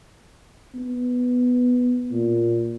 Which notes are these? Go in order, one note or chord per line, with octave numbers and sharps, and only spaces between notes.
B3
A#2